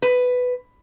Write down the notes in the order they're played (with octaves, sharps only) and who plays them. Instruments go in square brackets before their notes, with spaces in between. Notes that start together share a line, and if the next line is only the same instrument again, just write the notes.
[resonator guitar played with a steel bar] B4